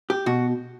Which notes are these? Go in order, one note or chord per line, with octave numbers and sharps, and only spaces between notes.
G4
B2 F#4